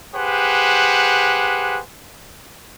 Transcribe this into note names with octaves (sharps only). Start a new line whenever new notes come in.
G4 G#4 B4 C5 F#5